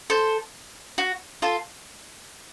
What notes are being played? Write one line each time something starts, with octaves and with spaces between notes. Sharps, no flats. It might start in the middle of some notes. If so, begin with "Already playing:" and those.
A4 C5
F#4
F4 A4